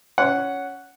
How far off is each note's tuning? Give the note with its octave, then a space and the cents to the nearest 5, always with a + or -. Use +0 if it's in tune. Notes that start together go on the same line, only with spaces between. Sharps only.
C#4 +10 F#5 +0